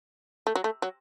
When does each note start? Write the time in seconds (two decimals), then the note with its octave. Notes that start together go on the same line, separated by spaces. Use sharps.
0.47 A3
0.55 F#3
0.64 A3
0.82 F#3